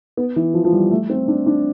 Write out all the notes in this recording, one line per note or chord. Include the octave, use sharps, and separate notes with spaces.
B3
E3
F3
F3
G3
A3
C4
D4
D4